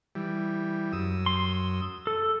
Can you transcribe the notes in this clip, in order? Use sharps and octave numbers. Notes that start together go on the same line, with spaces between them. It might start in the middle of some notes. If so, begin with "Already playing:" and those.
E3 G3
F#2 D#6 E6
C6
A4